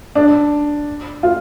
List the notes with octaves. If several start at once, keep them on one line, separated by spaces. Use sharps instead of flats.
D4
F4